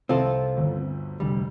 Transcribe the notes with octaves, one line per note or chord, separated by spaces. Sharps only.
C2 C4 F4 A4
G1 D2
F1 D2 G3